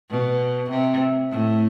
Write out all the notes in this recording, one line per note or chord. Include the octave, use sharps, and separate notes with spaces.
B2
C3
A2